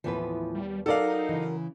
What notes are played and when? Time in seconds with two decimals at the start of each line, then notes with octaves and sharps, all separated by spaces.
0.04 D#2 A2 E3 F3 B3 B4
0.55 G3
0.86 F#3 D#4 A4 A#4 D5 F5
1.29 C#3 E3